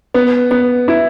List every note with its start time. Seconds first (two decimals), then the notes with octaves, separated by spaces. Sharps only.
0.14 B3
0.51 B3
0.88 E4